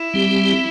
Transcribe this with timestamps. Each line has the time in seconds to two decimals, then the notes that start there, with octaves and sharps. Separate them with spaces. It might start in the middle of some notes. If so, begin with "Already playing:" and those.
Already playing: E4
0.14 G3 C4 G4